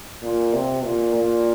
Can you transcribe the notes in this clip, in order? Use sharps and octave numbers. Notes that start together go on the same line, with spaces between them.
A#2
C3
A#2
A#2